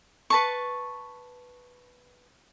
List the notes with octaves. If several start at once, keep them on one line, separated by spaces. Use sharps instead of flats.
B4 A5 C#6